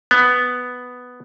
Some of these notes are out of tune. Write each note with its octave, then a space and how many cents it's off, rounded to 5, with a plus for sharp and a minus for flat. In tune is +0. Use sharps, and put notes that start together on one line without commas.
B3 +5